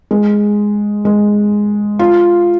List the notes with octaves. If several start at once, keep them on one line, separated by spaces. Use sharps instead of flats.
G#3
G#3
F4